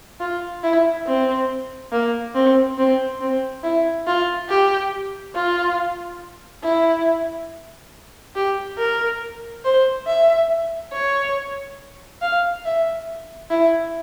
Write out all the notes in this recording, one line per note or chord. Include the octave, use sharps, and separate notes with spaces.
F4
E4
C4
A#3
C4
C4
C4
E4
F4
G4
F4
E4
G4
A#4
C5
E5
C#5
F5
E5
E4